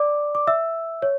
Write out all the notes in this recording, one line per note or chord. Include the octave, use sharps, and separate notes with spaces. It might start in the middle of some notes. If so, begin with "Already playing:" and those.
Already playing: D5 D6
D6
E5 E6
C#5